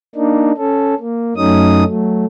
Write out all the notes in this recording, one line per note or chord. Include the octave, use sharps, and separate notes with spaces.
A#3 D4 D#4
C#4 A4
A#3
F#2 F#3 A3 C#4 D#4 D#6
F#3 A3